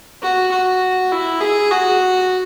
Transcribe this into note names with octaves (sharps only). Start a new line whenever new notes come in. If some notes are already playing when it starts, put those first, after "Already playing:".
F#4
F#4
E4
G#4
F#4